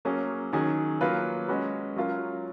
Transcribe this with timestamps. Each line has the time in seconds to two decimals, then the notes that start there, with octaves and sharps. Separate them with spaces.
0.05 F#3 A#3 C#4 G#4
0.53 D#3 F#3 C#4 G#4
1.01 F#3 A#3 F4 B4
1.48 G#3 C#4 F#4 B4
1.96 F#3 C#4 F4 A#4